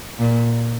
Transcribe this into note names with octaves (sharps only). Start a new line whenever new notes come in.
A#2